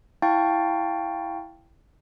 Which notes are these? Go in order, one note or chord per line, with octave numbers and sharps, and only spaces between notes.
E4 F5 G5 A5 C#6 A6